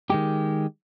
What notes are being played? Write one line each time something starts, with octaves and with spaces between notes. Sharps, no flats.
D#3 G#3 G4